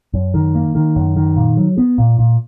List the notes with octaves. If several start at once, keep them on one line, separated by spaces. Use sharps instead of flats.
F#2
D#3
A#3
D#3
F#2
D#3
A#2
F#3
B3
A#2
A#2